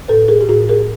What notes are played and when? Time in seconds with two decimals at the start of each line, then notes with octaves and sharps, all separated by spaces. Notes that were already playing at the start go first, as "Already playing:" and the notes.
0.08 A2 A4 B4
0.28 G#4 A#4
0.41 G4
0.49 A2 F#4 G#4
0.69 G#4 A#4